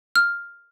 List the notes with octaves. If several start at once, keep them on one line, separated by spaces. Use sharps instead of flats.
F6